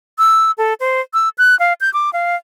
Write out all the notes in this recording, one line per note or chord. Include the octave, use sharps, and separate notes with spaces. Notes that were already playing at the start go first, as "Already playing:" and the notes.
E6
A4
C5
E6
F#6
F5
G6
D6
F5